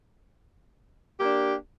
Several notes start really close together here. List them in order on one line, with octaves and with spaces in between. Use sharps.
G4 A#3 D4